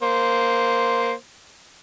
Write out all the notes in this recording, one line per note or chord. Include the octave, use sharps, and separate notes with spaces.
A#3 C5